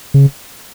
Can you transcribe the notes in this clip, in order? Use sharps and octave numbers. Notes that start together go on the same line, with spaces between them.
C#3